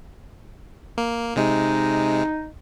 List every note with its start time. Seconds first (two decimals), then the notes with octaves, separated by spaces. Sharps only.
0.98 A#3
1.36 C3 G#3 D#4